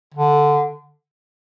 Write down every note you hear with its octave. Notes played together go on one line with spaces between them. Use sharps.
D3